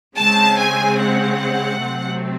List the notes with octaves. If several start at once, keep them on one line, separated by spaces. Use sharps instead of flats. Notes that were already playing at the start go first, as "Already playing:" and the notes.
C#3 G#3 C4 A5
G#5
F#5
C3 F#3 A3 C4